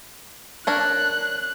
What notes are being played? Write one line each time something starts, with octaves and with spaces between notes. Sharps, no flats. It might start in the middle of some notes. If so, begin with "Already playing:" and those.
D4 A#4 C#5 F#6